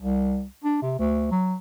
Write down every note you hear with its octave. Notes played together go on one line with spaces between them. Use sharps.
C2
D4
C3
D2
F#3